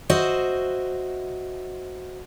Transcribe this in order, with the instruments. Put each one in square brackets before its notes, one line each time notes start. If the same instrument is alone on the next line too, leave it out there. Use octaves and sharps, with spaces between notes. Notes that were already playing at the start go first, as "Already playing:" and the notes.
[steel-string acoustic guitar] F#4 C5 D#5 E5